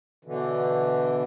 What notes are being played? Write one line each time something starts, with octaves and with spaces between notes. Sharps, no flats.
B2 D3 E3